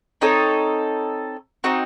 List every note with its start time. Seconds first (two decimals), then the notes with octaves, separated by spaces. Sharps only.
0.21 C4 D#4 A4 C#5
1.64 C4 D#4 F#4